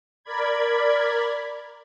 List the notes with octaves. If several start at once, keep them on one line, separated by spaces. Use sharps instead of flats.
A#4 D5 B5 G#6